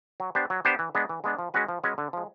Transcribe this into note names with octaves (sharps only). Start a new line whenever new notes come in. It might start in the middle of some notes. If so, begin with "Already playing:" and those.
F#3
B3 D4 G4 C5
F#3
B3 D4 G4 C5
E3
G#3 B3 D4
E3
G#3 B3 D4
F3
G#3 C#4 F#4 B4
F3
G#3 C#4 F#4 B4
D3
F3 G#3